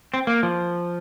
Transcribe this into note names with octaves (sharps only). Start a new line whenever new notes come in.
C4
A#3
F3